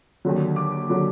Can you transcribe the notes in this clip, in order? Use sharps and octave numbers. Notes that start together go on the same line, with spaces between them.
D#2 D3 F#3
D6
D3 F#3